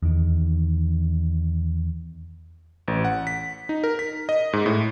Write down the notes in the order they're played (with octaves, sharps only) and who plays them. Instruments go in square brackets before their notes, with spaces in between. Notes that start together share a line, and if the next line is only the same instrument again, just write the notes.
[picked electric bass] E2 D#3
[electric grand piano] A1
F#5
B6
D#4
A#4
B6
D#5
G#2
A2